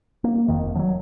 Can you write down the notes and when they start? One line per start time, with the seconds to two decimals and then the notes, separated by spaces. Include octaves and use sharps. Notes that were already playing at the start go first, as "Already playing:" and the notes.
0.24 A#3
0.48 F1 B1 F2 D#3
0.75 F3 F#3